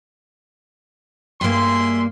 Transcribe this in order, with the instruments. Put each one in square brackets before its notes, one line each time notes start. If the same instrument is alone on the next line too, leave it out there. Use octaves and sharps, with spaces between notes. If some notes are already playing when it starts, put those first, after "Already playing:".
[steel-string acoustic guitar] G2 A#3 [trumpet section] G#4 E5 C6